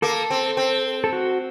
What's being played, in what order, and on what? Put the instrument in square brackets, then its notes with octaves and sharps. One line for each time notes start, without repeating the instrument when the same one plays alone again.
[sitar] A#3 [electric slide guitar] A4
[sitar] C4
C4
[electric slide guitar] A4
F#4